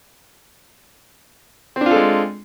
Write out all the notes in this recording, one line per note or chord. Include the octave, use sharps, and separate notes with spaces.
G#3 C4 D4 F4 A4